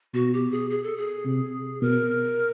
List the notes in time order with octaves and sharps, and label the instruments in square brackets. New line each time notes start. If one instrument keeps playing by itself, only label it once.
[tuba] B2 [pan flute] F#4
[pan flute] G4
G#4
G#4
A4
G#4
[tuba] C3
[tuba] B2 [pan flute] A#4